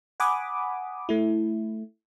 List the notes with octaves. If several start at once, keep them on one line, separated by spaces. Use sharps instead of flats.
F#5 G#5 B5 D6 D#6
A3 E4